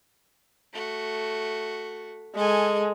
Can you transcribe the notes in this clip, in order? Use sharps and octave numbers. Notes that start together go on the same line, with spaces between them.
A3 F#4
G#3 A4 G#5